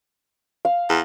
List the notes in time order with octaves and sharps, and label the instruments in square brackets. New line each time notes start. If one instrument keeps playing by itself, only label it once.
[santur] F5
[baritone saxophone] E2